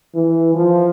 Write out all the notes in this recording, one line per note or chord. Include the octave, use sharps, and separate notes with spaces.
E3
F3